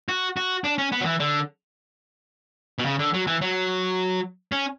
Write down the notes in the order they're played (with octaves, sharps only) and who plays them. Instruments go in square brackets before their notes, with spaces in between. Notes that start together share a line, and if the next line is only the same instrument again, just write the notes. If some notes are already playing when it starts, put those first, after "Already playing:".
[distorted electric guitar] F#4
F#4
D4
C#4
B3
F#3
E3
D3
B2
C#3
D3
F#3
E3
F#3
C#4